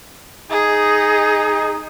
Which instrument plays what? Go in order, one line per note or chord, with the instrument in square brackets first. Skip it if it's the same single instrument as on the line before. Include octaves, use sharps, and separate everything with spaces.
[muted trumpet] D#4 [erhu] G#4